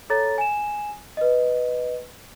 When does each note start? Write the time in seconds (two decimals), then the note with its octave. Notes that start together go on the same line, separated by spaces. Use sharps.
0.10 A4 C#5 A#5 A6
0.38 G#5 E7
1.17 B4 D#5